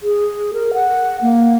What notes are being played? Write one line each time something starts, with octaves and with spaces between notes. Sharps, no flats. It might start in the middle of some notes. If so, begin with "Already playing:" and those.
G#4
A#4
F#5
A#3